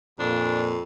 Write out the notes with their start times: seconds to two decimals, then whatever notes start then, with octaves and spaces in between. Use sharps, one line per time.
0.19 F2 A#2 D4